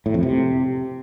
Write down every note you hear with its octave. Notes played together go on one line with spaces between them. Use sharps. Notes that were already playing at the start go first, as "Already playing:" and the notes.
A2
F2
C3